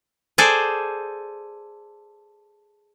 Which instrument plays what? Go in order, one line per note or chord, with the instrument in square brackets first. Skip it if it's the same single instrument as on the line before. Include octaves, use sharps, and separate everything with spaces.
[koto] G#4 A4 C5 D5